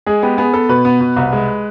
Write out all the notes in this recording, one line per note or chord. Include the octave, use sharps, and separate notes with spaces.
G#3 G#4
B3 G4
B3 G#4
B3 A4
B2 B4
B3
B2
C2
G#3